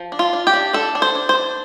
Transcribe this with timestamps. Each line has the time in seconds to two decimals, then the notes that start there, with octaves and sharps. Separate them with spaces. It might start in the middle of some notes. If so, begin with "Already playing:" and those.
Already playing: F3
0.12 D4
0.19 F4
0.33 D4
0.47 G4
0.53 D4
0.73 D4 A4
0.95 D4
1.02 C5
1.15 D4
1.29 C5
1.35 D4